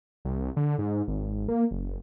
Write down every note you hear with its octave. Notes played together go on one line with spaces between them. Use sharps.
C2
D3
G#2
G#1
A#3
F#1